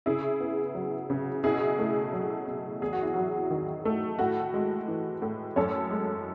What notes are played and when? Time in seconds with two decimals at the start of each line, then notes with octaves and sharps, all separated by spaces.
0.06 C#3 E4 G#4
0.40 B3
0.75 F#3
1.10 C#3
1.43 B2 E4 G#4
1.79 A3
2.13 F#3
2.48 B2
2.81 E2 G#4
2.93 F#4
3.03 E4
3.14 F#3 F#4
3.51 D#3
3.85 A3
4.19 A2 F#4
4.54 G#3
4.88 E3
5.22 A2
5.56 F#2 A4 C#5
5.91 G#3